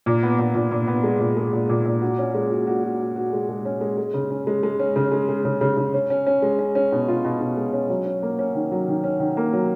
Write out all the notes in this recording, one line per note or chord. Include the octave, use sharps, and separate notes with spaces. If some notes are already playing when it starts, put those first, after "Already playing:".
A#2
B3
A#2
A#2
A#2
B3
G#3
A#2
G#3
A#2
A#2
A#2
F#4
C#4
G#3
F#4
F#4
F#4
F#4
F#4
G#3
G#3
C#4
G#3
G#3
C#3
C#4
G#3
G#3
C#4
C#3
G#3
G#3
C#3
C#3
C#3
C#4
C#4
C#4
G#3
C#4
C#4
B2
F4
B2
B2
G#3
C#4
F#3
C#4
A#3
C#4
D#3
F#3
D#3
C#4
D#3
A#3
F#3